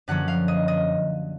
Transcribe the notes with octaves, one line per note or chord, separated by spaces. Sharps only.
F#2 D3 F3 A#3 C#4 F#5
F5
D#5
D#5